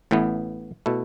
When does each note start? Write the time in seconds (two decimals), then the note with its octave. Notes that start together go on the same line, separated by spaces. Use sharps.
0.11 A1 A2 E3 B3
0.86 B2 A3 E4